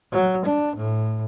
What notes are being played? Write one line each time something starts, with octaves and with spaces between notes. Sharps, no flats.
F#3
D4
A2